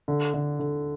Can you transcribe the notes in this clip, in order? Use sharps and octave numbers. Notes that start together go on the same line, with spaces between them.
D3
D3
D3